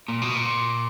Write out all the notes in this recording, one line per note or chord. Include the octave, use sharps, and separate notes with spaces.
A#2
B2
A#2